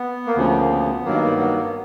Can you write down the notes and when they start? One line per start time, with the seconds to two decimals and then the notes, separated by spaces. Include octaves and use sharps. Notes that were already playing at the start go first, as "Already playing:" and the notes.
Already playing: B3
0.26 A#3
0.36 D2 C#3 F3 B3
0.59 A#3
0.70 B3
1.05 G2 D#3 F#3 A#3
1.40 B3
1.57 B3